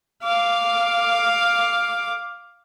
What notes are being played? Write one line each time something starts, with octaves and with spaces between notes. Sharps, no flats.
F5 D6